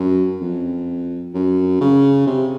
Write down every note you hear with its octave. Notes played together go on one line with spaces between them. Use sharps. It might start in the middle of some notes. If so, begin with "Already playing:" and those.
Already playing: F#2
F2
F#2
C#3
C3